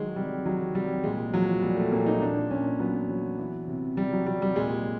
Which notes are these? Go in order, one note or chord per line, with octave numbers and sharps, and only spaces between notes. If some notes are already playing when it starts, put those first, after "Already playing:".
Already playing: D#3 F#3 G#3
C3 G3
D#3 F#3
C3 G3
A#2 G#3
F3 F#3
A#2 G3
A3
A#2 A#3
D#4
A#2 D4
A#2 C#4
F#3 B3
F#3
E3
C3
C3 G3
F#3
C3 G3
G3
A#2 G#3